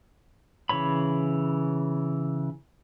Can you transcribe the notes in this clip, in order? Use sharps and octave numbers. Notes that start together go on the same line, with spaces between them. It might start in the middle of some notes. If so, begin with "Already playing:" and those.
C#3 E3 C#5 B5